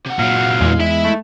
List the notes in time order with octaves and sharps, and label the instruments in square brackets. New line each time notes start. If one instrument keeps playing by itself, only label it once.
[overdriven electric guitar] C3 F#5
[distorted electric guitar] A#2 F#3 [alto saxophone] F5
[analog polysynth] E2 [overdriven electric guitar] G#3
[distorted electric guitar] E4 E5
[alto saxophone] A3